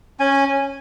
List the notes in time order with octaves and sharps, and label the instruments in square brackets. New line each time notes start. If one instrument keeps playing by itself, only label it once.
[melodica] C#4 G#5